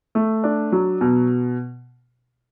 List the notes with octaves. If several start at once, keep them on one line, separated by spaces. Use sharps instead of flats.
A3
D4
F#3
B2